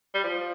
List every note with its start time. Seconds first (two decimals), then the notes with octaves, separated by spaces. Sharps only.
0.14 G3
0.24 F3